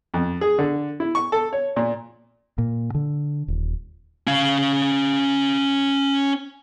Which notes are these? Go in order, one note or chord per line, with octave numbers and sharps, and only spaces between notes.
F2
G#4
D3
E4
C#6
A4
C#5
A#2
A#2
D3
D#1
C#4 F5